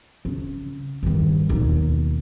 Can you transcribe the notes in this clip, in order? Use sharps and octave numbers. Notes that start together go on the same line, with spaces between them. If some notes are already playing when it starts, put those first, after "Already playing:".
C#3
G2 D#3
D#2 B2